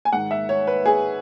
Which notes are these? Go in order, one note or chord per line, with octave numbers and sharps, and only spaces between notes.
G#5
G#2 D#3 F#5
E5
C#5
B4
G#4